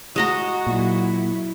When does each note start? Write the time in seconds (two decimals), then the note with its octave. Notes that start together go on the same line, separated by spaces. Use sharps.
0.16 G#3 F#4 D#5 A#5
0.67 A#2 F#3 E4